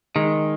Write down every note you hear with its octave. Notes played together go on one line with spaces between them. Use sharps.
D#3 G#3